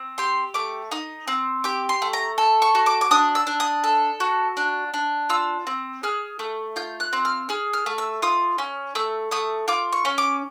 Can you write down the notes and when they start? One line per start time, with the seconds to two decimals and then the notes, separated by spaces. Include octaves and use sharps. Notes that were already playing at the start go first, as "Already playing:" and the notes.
Already playing: C4
0.18 G4 C6
0.54 A3 D6
0.91 D#4 D#6
1.28 C4
1.64 G4 D6
1.89 C6
2.02 A3
2.13 A#5
2.38 A4
2.62 C#6
2.75 F#4
2.86 D6
3.01 D6
3.11 D4 D#6
3.35 E6
3.47 D4
3.60 D#6
3.84 A4
4.20 F#4
4.57 D4
4.94 D4
5.29 F4 E6
5.67 C4
6.03 G#4 F6
6.39 A3
6.76 F4 G6
7.00 F#6
7.13 C4
7.25 F6
7.49 G#4 F6
7.73 F6
7.86 A3
7.98 E6
8.22 F4 D#6
8.58 C#4
8.95 A3 E6
9.31 A3 D#6
9.68 F4 D6
9.93 C#6
10.05 C#4
10.18 D6